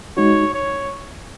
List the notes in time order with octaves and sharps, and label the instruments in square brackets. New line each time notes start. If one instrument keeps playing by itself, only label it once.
[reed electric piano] G#3 D#4 F#4 [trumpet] C#5
[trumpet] C#5